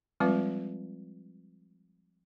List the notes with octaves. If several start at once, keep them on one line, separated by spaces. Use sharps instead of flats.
F3 G3 G#3 C4 F4 B4